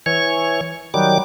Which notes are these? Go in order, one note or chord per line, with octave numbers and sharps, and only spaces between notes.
E3 C#5 C#6
D#3 F#3 G3 D6